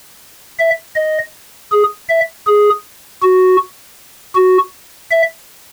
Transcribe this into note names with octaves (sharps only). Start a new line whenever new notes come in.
E5
D#5
G#4
E5
G#4
F#4
F#4
E5